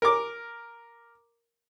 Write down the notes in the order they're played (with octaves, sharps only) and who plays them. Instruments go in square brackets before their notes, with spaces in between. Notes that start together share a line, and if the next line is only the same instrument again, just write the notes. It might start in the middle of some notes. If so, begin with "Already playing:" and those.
[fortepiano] A#4 D6